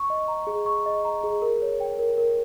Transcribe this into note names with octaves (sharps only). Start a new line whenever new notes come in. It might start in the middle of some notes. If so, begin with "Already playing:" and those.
Already playing: C#6
D#5
A#5
G#4
C#6
D#5
A#5
G#4
A#4
C#5
G5
A#4
A#4